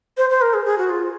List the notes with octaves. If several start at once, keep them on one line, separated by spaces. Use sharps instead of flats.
C5
C5
A#4
G#4
G#4
F#4
F4